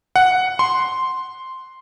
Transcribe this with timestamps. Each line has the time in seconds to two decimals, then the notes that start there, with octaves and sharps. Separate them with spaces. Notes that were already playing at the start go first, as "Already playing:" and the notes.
0.16 F#5
0.59 C6